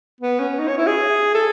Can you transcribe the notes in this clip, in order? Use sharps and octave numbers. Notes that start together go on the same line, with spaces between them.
B3
C#4
D#4
C#5
E4
G#4
A4